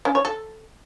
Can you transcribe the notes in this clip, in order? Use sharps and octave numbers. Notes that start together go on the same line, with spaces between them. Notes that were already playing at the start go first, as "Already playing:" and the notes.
C#4
C#5
A4